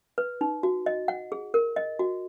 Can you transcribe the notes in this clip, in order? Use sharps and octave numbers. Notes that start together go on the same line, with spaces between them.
B4
D#4
F#4
D#5
F#5
G#4
A#4
D#5
F#4